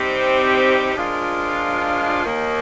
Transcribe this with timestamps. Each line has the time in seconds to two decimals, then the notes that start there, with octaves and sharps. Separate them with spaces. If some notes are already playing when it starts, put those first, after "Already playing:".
Already playing: C3 G3 C4 D#4 G4
0.94 F3 G#3 D4 F4 A#4
2.25 D#2 D#3 A#3